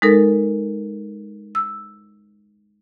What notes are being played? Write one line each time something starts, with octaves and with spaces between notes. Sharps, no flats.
G#3 D#4 A4 A#4
E6